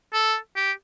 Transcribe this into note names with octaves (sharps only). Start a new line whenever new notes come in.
A4
G4